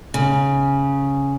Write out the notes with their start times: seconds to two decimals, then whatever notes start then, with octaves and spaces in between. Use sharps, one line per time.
0.14 C#3